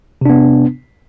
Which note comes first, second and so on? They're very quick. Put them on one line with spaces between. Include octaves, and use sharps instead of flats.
C3 D4 B3